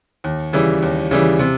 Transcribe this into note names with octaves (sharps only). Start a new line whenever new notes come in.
D#2
C#3 E3 G3
D#2
C#3 E3 G3
C3